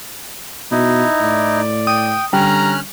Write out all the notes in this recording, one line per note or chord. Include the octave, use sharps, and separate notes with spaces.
B2 D#4 E4
A2 D5
G5 D#6
D3 G3 C#4 A#5 F6 F#6